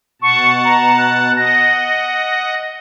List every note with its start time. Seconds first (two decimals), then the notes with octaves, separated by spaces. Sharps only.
0.22 B2 F#5 A5 C#6
0.65 A#5
0.97 F#6
1.37 D#5 F#5 A#6
1.88 A#6